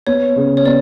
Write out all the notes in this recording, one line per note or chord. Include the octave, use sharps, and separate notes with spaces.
B3 C#5
C#3
C#5
B3 D5